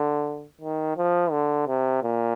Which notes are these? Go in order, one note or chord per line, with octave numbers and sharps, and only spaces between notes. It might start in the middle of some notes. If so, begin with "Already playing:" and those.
Already playing: D3
D#3
F3
D3
C3
A#2